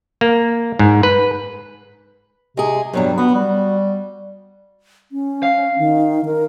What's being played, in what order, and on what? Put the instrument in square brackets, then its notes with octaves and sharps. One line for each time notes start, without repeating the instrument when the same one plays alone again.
[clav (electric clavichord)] A#3
G#2
B4
[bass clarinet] C3 [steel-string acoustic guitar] G#3 G#4
[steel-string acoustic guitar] G2 B2 G3 [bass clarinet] F#3
[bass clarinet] B3 [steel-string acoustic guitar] F#4
[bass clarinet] G3
[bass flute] C#4
[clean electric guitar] F5
[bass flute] D#3
A#4